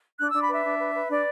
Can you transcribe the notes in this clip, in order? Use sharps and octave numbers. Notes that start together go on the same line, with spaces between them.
D4 F#6
D4 E6
B5
B4 E5
D4
B4
B4
D4 D5